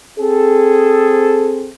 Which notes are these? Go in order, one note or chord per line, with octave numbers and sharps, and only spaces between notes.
C4 G#4 A4